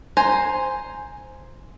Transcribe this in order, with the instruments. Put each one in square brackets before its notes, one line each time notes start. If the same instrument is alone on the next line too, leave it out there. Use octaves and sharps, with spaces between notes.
[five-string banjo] C5 G#5 A#5